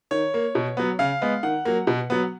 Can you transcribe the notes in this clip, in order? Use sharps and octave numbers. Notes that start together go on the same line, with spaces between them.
D#3 C#5
A#3
B2
F#3 B3
C#3 F5
G#3 B3
D#3 F#5
F#3 A#3
B2
F#3 B3